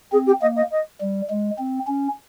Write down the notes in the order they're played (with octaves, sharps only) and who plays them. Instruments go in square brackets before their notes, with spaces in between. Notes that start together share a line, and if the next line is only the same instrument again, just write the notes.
[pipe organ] C4 [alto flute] G#4
[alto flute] G4
[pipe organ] A#3 [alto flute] D#5
[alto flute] D#5
D#5
[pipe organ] G3
G#3
C4
C#4